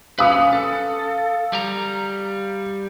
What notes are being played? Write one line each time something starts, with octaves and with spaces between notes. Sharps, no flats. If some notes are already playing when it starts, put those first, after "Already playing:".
C#4 B4 F5 D#6
A4
G3 A#5